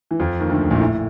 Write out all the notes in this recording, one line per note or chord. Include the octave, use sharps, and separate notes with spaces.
E3
F2 F3
D#2 D#3
D2 D3
A#1 A#2
A2